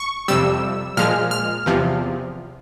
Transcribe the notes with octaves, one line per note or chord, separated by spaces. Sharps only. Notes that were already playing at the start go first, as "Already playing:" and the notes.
Already playing: C#6
F2 C3 G3 E6
A#2 F3 G#3 F6
F6
E2 C3 F3